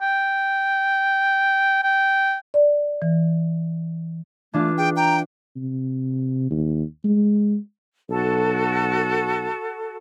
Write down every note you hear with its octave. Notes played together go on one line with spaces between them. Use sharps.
G5
G5
D5
E3
E3 A3 D4 F4
G#4 G5
G5 A#5
C3
D#2
G#3
B1 F#4 A4